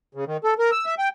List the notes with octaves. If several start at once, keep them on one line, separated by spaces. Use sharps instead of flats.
C#3
D#3
A4
A#4
E6
E5
G5